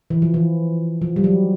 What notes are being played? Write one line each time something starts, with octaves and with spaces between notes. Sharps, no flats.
E3
F3
E3
F3
G3
F#3